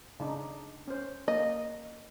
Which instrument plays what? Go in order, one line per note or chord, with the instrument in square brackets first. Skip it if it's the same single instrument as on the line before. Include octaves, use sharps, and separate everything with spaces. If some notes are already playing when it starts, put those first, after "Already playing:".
[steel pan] C#3 D4 D#4
C#4 C5
[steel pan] A#3 [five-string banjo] D#5